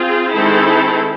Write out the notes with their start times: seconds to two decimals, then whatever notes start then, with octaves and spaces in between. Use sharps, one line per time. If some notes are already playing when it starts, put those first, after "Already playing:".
Already playing: C4 F4 G#4
0.33 D#3 G#3 C4 E4 A4